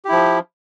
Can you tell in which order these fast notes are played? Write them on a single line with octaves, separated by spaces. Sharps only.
G4 E4 F3